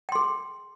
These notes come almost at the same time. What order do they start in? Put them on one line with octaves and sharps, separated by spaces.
G5 C6 G#4